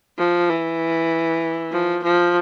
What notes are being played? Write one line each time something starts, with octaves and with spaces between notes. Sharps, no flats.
F3
E3
F3
F3